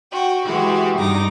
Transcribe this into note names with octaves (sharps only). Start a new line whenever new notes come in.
F#4 G5
E3 G#3 F#4 G4
G2 D#4 D6 A#6